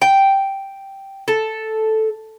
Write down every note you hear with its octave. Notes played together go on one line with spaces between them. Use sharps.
G5
A4